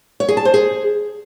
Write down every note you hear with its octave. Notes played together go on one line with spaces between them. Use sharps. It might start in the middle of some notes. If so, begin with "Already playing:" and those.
C#5
G#4
A5
C5
G#4